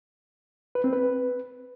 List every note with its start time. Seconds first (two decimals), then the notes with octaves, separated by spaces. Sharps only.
0.75 B4
0.84 C4
0.93 B4